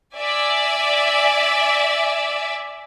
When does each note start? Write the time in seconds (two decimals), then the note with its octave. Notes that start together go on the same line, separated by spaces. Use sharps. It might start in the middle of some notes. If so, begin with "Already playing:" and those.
0.16 D5 E5 G#5